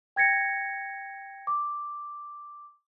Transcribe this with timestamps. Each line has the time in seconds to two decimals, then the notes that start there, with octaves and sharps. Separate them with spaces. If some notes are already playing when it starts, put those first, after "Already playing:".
0.16 G5 G#6 A#6 C#7
1.47 D6